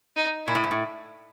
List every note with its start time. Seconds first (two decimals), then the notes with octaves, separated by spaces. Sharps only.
0.16 D#4
0.47 A#2 E4
0.55 A2
0.64 G#2
0.71 A2